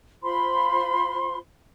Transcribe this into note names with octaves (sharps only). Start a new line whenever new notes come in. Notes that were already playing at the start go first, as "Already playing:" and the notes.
F4 C5 B5 C6